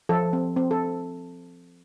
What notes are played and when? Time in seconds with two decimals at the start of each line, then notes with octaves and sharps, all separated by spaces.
0.09 F3 A4
0.33 C4
0.57 C4
0.71 A4